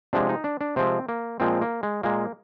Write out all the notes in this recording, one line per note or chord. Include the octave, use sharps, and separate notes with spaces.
C3 F3 G#3 D4
D#4
D4
D4
C3 F3 G#3 C4
A#3
A#2 F3 G#3 C4
A#3
G#3
A#2 G#3 A#3